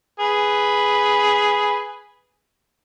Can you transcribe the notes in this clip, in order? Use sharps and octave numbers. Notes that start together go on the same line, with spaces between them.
G#4 B4